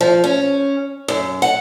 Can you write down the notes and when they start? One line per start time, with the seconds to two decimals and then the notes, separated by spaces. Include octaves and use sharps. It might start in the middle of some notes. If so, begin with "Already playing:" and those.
0.01 F3
0.24 C#4
1.08 F#2
1.42 F#5